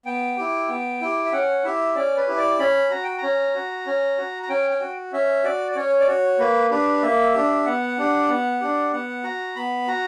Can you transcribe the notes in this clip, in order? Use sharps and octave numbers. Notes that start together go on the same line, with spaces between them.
B3 G5
E4 G4
B3
E4 G4
E5
C#4 F#5
E4 G4 E5
C#4 D5
B4
E4 G4
D5
C#4 B5
F#4 A#5
G5
C#4 A#5
F#4
C#4
F#4
A#5
C#4 G5
G5
F#4
C#4 E5
F#4 D5
D5
C#4 C#5
D5
F#4 C#5
A#3 B4
D4 G4 B4
A#3 E5
D4 G4
B3 F#5
D4 G4
B3
D4 G4
B3 F#5
F#4 A#5
B3 B5
F#4 A#5